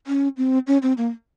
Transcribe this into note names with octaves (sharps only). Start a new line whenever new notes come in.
C#4
C4
C#4
C4
A#3